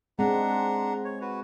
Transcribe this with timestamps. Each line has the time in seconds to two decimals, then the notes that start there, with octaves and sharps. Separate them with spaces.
0.19 G#3 C4 D4 F#5 A#5
1.04 C#5
1.21 F#4 B4